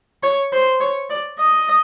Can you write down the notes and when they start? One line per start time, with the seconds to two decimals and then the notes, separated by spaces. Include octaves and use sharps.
0.23 C#5
0.53 C5
0.81 C#5
1.10 D5
1.39 D#5